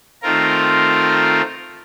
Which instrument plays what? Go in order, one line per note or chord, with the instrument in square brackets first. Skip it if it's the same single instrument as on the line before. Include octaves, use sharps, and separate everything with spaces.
[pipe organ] D#3 A3 C4 F4 A#4